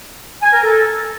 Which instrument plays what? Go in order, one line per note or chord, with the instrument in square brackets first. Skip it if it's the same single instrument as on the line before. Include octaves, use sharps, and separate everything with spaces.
[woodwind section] G#5
A#4
A4